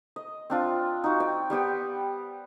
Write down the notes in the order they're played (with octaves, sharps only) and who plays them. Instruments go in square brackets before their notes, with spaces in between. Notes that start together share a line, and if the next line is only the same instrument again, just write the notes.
[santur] D#5
C4 D4 F4
D#4 F#4
D5 G5
G3 B3 G4 F#5